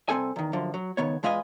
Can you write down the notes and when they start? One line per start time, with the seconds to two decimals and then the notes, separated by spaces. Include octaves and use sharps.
0.09 C2 F3 C4 A4 G#5
0.36 E2 D#3
0.53 F#2 D3 F3
0.74 F#3
0.97 C#2 D#3 B3 C#5
1.23 E2 G#3 F4 B4 D#5 G#5